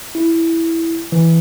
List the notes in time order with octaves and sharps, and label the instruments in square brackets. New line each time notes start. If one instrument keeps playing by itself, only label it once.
[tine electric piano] E4
E3